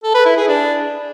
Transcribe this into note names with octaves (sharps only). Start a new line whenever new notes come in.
A4
B4
E4
G#4
D4